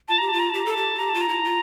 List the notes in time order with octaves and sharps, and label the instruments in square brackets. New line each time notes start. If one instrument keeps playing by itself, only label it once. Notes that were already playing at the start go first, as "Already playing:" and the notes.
[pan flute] F4 [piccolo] A5
[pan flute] G4 [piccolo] A#5
[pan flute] F4 [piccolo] A5
[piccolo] A#5
[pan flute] G4 [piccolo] A5
[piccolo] A#5
[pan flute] A4 [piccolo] A5
[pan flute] G4
F4
[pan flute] G4 [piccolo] A#5
[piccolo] A5
[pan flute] F4
[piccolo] A#5
[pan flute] E4
F4